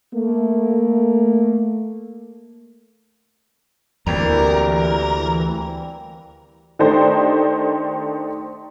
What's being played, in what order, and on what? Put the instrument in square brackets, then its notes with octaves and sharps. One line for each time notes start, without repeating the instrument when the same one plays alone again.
[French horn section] A3 A#3
[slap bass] D2 [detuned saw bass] E3 [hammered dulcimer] G3 A#3 C4 [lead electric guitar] A#4
[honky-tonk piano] D#3 A3 D4 D#4 G4 C5